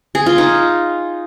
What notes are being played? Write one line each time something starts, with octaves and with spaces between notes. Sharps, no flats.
G#4
F4
D#4